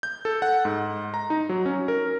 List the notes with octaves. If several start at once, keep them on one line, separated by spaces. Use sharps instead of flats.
G6
A4
F#5
G#2
A#5
D#4
F#3
C#4
A#4